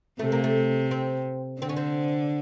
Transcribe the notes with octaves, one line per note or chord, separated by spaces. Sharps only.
C3 A3
A#3
A3
C4
D3 C4
C#4
C4